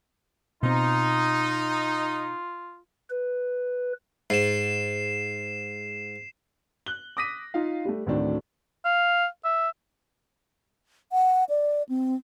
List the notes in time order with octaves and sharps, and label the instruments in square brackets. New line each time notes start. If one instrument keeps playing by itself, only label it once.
[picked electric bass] B2 C4 [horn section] D#4 [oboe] F4
[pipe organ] B4
[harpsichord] G#2 [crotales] C7 E7
[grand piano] F#6 G7
D6 D#6 A#6 B6 D#7
D#4 F4 F5
G3 A3
D2 A2 D#3 F#3 C4 D4
[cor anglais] F5
E5
[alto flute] F#5
D5
C4